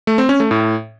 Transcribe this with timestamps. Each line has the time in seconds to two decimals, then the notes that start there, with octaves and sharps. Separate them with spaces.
0.07 A3
0.18 C4
0.29 C#4
0.40 A3
0.51 A2